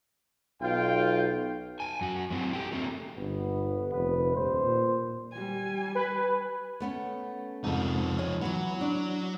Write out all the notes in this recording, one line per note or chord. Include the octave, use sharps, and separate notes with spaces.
B1 F4 G5
G5 G#5
F#2 F#4
F#3 C4 E4
G4 A4 G5
F#3 A3 A#3 C4 D#4
G1 B3
F1 B4
D#1 C5
A#2
G3 G#5
B4
A3 B3 C#4
C2 F2 G#2 F3 D#4
C#5 G#5
E3 F#3 B3
D4